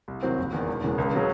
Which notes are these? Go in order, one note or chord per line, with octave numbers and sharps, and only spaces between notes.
C2
C3 D#3 F#3 C4
F#1
E2 D#3
E1
E2 C#3 G#3
C#2
C#3 F#3 C#4